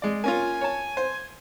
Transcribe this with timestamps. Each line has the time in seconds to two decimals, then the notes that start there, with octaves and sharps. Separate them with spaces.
0.02 G#3 D5
0.24 A#3 C#4 F4 G#5
0.61 C#5 A5
0.97 C5